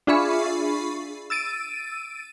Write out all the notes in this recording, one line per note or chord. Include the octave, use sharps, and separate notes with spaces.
D4 F4 G#4 E5 B5 C#6
E6 A6 D7 D#7